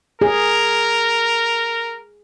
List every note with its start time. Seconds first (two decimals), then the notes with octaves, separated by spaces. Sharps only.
0.21 G#4 A#4